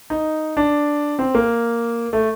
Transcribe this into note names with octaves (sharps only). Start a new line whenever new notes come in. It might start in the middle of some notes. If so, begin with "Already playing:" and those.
D#4
D4
C4
A#3
A3